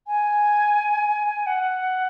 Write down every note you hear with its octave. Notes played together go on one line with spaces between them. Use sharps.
G#5
F#5